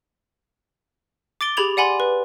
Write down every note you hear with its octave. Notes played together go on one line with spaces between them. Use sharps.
D6 A6 D7 G7
G4 G#4 B5 G#6 F7
D5 F#5 G#5 B5 C6
B4